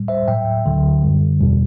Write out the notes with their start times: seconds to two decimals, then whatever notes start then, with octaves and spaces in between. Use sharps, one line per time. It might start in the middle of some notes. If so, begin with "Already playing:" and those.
Already playing: A2 G3
0.08 C5 E5
0.28 A2 F#3 E5 G5
0.66 D2 D3 F#3
1.02 F#2 D3 G3
1.41 E2 B2 G3